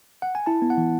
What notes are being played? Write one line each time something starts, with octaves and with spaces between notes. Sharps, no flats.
F#5
G#5
E4 A5
B3
F#5
E3